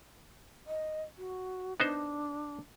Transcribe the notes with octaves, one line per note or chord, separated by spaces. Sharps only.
D#5
F#4
B3 D4 D#4 C5